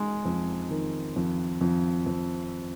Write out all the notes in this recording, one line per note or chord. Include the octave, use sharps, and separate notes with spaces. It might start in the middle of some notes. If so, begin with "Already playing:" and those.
Already playing: G#3 D#4
F2
D#3
F2
F2
F2